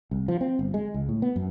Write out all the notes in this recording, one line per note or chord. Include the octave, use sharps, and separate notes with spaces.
C2
F3
C4
G1
G#3
C#2
A2
B3
F#2